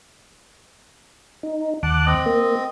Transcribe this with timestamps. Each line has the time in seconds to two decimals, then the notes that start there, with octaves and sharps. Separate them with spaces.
1.43 D#4
1.83 D#2 F#5 A5 D6 F#6
2.06 C4 D#5
2.26 A#3